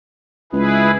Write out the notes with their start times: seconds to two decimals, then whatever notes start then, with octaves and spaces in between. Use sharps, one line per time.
0.53 C#2 E4 G#4 B4